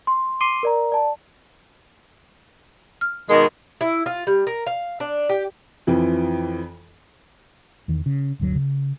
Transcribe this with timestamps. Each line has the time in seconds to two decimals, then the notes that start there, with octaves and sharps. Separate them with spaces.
0.07 C6
0.41 C6 D6 C7 D7 D#7 G7
0.63 A#4 D5 A#5
0.92 D5 A5
3.01 F6
3.29 B2 D#3 G#3 A#4
3.81 E4
4.06 F4
4.27 G3
4.47 A#4
4.67 F5
5.00 D4
5.29 G4
5.87 F2 E3 F3
7.88 E2 D#3
8.06 C#3
8.40 G1 D2 F#3
8.55 C#3